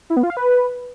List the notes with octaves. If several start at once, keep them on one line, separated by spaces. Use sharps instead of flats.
E4
B3
F4
F5
B4